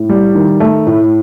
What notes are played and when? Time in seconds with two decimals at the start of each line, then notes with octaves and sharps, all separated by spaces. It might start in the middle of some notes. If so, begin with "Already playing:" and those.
Already playing: A2
0.09 G3
0.35 D#3
0.60 A3
0.87 A2